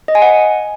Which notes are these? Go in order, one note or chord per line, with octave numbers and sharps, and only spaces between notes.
D#5
G#5
F#5